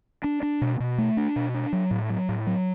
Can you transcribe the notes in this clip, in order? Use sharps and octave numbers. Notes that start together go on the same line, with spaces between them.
D4
D4
B2
B2
A3
D4
B2
D4
F#3
A2
F#3
A2
F#3